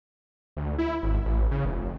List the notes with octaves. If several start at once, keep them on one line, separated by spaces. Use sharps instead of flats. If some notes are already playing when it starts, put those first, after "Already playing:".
D2
E4
G#1
A1
C#3
F1